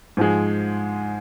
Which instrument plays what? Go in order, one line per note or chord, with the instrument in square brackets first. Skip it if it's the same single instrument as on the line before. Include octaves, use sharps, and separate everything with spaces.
[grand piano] G#2 F3 G#3